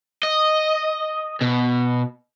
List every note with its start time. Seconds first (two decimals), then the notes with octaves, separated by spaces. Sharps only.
0.23 D#5
1.42 B2